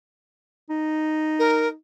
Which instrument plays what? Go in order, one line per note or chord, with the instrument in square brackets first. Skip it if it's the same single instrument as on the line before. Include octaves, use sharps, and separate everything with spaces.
[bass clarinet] D#4
[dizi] A#4